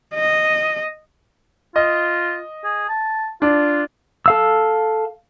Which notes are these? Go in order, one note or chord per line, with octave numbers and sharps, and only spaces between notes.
D#5
F4 D#5
G#4
A5
D4 F4
A4 F5 E6